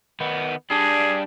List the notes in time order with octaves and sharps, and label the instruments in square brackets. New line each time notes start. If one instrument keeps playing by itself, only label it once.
[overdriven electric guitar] D#3 B3
[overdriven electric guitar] G3 D4 [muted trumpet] G#4